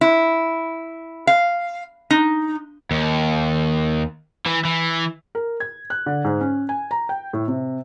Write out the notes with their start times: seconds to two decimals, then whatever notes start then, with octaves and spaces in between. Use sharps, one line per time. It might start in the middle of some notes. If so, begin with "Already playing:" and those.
0.01 E4
1.27 F5
2.10 D#4
2.91 D#2
4.46 E3
4.65 E3
5.35 A#4
5.60 G#6
5.90 F#6
6.06 D3
6.24 G#2
6.41 C#4
6.69 G#5
6.91 A#5
7.09 G5
7.33 A2
7.48 C3